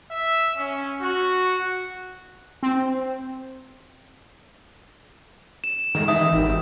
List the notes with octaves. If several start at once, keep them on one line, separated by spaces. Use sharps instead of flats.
E5
C#4
F#4
C4
E7
D3 D#3 G#3 A3
D#3 E3 B3 D#4 E5 D#6
G#1 E2 C3